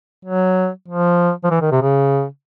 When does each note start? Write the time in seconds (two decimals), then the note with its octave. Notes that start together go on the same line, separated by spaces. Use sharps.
0.25 F#3
0.88 F3
1.44 F3
1.51 E3
1.61 D#3
1.71 C3
1.82 C#3